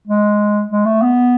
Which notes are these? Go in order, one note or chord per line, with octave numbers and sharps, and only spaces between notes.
G#3
G#3
A3
B3